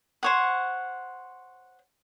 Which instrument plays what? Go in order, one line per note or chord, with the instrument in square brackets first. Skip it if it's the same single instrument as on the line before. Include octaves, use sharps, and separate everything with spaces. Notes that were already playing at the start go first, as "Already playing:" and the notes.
[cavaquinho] C5 C#5 F#5